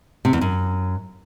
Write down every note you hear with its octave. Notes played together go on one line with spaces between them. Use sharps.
C3
E2
F#2